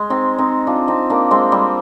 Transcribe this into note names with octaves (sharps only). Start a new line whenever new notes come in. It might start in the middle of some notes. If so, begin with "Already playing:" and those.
Already playing: G#3
C4 D#4
C4 D#4
D4 F4
C4 D#4
A#3 D4
G#3 C4
G3